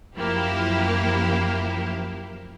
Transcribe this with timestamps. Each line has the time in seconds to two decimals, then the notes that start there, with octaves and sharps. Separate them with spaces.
0.16 F#2 F3 A#3 E4 G4